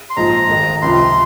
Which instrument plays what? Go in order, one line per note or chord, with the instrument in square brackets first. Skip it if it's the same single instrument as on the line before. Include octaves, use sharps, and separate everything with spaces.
[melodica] C6
[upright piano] A#1 G#2 F3 G#3 [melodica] A#5
[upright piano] G#1 G#2 D#3 G#3
[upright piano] C#2 C3 F3 [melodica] C6